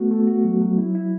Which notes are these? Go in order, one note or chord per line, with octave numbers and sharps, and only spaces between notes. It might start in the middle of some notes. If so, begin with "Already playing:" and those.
Already playing: A3 B3 F#4
A3
F#4
F#3
F#3
E4
E4